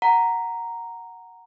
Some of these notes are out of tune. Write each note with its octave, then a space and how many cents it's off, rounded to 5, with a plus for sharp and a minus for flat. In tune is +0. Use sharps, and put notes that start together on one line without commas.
F#5 +0 A#5 +0